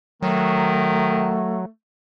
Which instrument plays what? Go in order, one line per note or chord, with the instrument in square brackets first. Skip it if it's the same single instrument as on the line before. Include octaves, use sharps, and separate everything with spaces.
[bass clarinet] D#3 [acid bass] F#3 [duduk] A3